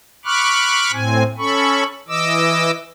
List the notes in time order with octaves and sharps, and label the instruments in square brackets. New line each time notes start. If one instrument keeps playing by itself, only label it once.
[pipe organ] B5 C#6 D6 F6 F#6
A2 C4 G#5
C#4 A4 B5 C#6
E3 D#5 D6 E6